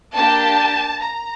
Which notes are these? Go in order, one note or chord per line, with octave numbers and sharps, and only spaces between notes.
A#3 D4 G4 A5
A#5